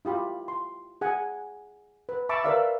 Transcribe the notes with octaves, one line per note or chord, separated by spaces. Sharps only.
E4 F4 G4 B5
C6
G#4 F#5 G#5
B4
E5 A5 B5 C#6 D6 E6
A#4 B4 D5 E5 F5 E6